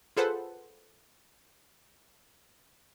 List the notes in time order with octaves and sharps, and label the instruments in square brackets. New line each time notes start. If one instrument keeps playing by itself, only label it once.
[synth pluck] F4 G#4 A4 B4 C5 F#5